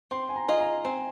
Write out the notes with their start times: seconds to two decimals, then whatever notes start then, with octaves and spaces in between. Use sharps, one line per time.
0.11 C4 C6
0.29 G#5
0.36 A#5
0.48 F4 G#4 D#5
0.60 A#5
0.85 C4 G#5